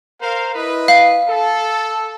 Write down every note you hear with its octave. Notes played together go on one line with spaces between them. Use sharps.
A#4 C5 F5
E4 B4 D#5
F5
A4